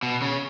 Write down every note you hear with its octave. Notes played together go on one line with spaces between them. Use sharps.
B2
C#3